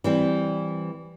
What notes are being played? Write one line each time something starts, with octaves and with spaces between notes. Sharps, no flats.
E3 G3 C4